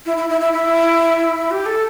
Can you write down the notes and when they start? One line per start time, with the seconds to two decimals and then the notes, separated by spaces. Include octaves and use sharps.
0.06 E4
0.17 E4
0.29 E4
0.41 E4
0.53 E4
1.51 G4
1.66 A4